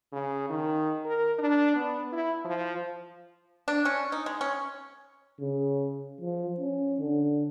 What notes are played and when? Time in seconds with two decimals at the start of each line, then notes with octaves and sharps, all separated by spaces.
0.12 C#3
0.49 D#3
1.05 A#4
1.38 D4
1.76 B3
2.12 E4
2.45 F3
3.68 D4
3.85 C#4
4.12 D#4
4.26 G#3
4.41 C#4
5.40 C#3
6.21 F3
6.60 C#4
7.01 D3